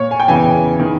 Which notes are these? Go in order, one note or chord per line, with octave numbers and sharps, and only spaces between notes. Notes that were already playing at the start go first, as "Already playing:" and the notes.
Already playing: A#2 C#5
G#5
G5
E2 C#3 E3 G#5
D#3